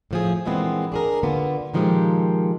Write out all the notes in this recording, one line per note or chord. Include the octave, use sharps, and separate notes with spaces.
A2 F3 G#4
G2 A#2 E3 G#3 B3 C4
D4 G#4 A#4
D3 A#3 B3 F4
A#2 D#3 F3 G#3 G4 A4